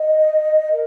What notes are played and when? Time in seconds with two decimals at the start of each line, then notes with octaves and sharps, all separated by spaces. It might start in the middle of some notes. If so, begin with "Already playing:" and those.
Already playing: D#5
0.72 A#4